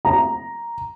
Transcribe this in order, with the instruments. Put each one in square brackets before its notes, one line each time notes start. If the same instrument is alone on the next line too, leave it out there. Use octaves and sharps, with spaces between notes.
[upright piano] A#5